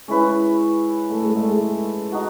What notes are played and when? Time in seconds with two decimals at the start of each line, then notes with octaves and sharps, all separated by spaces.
0.08 G#3 C#4 E4 B4
1.10 A3
1.22 G#3
1.36 A3
1.49 G#3
2.12 D#4 F#4